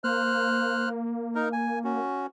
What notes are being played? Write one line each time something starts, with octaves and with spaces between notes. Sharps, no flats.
A#3 C5 F6 F#6
D#4 A#4
G#5
C#4 F#4